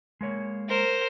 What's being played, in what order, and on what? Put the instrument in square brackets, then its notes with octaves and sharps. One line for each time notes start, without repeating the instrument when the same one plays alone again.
[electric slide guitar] G#3 A#3 C#5
[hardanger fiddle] A#4 C5